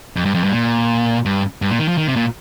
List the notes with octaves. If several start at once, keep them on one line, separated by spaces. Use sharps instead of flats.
F2
G2
F2
G2
A#2
G2
G2
A#2
D#3
F3
D#3
C3
A#2